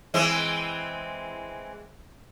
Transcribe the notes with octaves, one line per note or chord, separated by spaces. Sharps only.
E3 G#3 C4